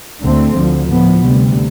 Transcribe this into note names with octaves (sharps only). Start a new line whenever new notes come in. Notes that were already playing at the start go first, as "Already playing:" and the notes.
D2 D3 A3 C4
D2 D3 F3
A2 F3 B3
D2 C3 G3